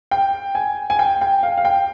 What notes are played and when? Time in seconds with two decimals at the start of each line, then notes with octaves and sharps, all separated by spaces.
0.11 G5
0.55 G#5
0.90 G#5
0.99 G5
1.21 G5
1.43 F5
1.57 F5
1.65 G5